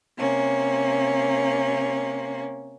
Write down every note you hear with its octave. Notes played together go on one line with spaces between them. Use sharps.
C3 A#3 C#4